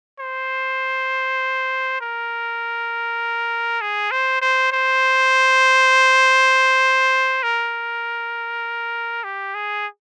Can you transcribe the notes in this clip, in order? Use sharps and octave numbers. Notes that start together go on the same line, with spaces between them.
C5
A#4
G#4
C5
C5
C5
A#4
G4
G#4